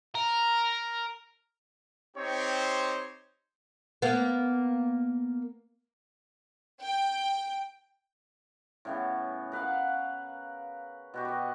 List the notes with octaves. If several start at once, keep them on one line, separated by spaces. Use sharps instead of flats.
A#4
C4 D#4 G4 C5 C#5
A#3 B3
G5
A2 C#3 B3
A#4 B4 F5 F#5
B2 F#4 G4
B4 D#5